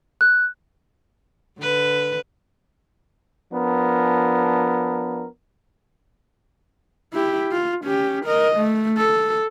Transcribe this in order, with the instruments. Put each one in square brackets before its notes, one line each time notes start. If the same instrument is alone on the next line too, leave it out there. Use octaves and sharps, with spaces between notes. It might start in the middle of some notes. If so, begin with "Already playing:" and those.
[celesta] F#6
[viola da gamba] D3 B4
[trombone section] F3 B3 D4 A#4
[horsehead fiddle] E4 G4
F4
C#4 G4
A#4 D#5
A3
A4